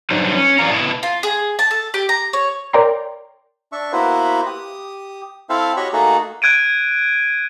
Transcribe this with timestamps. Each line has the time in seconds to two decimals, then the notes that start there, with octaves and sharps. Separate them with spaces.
0.10 G2 F#3 D4 D#4 B4 C5
0.35 C#4
0.59 E2 E3 F#3 D5 F5 A#5
0.70 B2 B3 E4 A5
1.03 F4
1.23 G#4
1.59 A5
1.71 A4
1.94 G4
2.09 A#5
2.33 C#5
2.73 A#4 C#5 D5 G5 A#5 C6
3.72 D4 E5 C#6
3.93 A#3 B3 E4 F#4 B4 C5
4.46 G4 D#6
5.49 C4 E4 A4 C5 E5 F5
5.77 F#4 G4 C#5 D#5 B5 C#6
5.93 A3 A#3 D#4 F#4 G#4 A4
6.42 F#6 G#6 D7 D#7